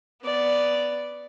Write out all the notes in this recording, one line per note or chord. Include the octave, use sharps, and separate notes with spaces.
B3 D5